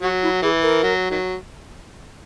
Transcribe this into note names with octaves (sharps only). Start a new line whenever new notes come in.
F#3 F#4
E4
E3 G#4
A#4
F#3
D#3 F#3